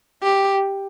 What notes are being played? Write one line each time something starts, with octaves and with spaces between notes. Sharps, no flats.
G4